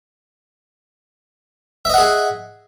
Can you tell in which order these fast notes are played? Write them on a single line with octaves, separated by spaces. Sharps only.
E5 D#5 F#5 G#4